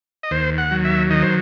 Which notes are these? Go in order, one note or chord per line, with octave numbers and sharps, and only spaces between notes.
D#5
D#2 C5
F#5
F#3
E5
D#3 D#5
C5